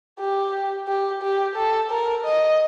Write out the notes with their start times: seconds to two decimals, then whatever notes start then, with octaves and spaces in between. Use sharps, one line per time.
0.20 G4
0.88 G4
1.23 G4
1.56 A4
1.91 A#4
2.25 D#5